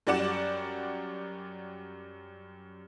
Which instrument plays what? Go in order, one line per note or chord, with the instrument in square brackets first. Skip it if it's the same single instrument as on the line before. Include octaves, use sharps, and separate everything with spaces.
[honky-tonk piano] F#2 G3 D5 F#5 E7